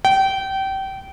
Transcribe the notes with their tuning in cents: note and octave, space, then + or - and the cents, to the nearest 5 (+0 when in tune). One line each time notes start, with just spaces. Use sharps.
G5 -25